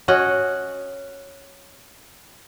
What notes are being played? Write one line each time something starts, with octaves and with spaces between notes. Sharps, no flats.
C#4 F#4 D#5 F#5